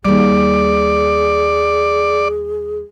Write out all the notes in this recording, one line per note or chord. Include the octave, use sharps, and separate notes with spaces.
D#2 G3 G#4 D5